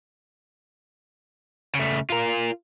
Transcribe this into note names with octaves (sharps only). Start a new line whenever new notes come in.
C#3 A3
F4 A#4